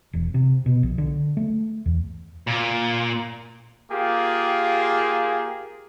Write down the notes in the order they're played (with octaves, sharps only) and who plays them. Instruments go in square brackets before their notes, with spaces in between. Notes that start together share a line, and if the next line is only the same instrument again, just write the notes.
[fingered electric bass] E1
C3
B2
A#1
D3
A3
E2
[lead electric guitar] A#2
[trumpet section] A#3 F4 G4 G#4